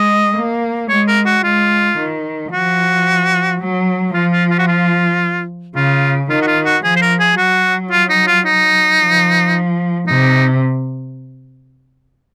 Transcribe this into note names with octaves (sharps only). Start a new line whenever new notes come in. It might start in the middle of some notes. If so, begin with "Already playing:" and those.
Already playing: G#3 D#5
A#3
G#3 C#5
A#4
F#4
G#3 F4
D#3
F3 F#4
F#3
F3 F4
F4
F4
F#4
F4
C#3 F4
D#3 F4
F#4
F4
F#4
F3 G#4
C5
A#4
G#4
F#3 F#4
F4
D#4
F4
D#4
F3
C3 D#4